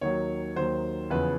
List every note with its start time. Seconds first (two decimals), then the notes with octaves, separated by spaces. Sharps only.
0.01 D#2 D#3 F#3 C#5
0.56 D#2 D#3 F#3 C5
1.10 E2 C#3 F3 B4